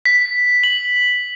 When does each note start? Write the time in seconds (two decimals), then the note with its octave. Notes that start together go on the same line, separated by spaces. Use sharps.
0.06 B6
0.64 F#7